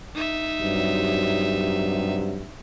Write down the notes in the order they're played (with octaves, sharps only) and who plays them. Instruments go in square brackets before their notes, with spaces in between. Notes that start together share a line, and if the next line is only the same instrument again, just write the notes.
[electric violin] D#4 E5
[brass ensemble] G2 C3 F#3